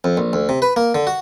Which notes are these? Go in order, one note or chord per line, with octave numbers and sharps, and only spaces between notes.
F2
A#1
D2
C3
B4
A#3
D3
F#4